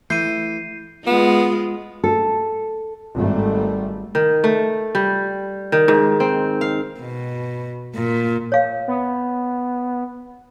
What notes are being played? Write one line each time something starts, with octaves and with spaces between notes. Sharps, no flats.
E3 A3 G6 C7 D#7
G#3 B3 F4
A4
G#1 G3 A3
D#3
A3
G3
D#3
G#2
C4
F5
B2
A#2
C#5 F5
B3